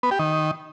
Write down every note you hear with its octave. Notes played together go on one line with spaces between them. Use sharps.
B3
G4
D#3